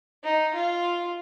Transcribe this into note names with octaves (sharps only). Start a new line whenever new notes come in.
D#4
F4